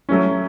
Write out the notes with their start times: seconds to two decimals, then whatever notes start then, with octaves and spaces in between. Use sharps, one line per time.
0.09 F#3 A3 C#4